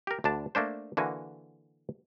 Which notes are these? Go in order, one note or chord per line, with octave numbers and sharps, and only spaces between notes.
G4 A#4
D2 D3 D4 A5
A3 A#3 D4 C5
D3 E3 A#3 F#4 G#5